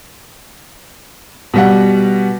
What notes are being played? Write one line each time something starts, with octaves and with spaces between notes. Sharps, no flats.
B2 G3 F#5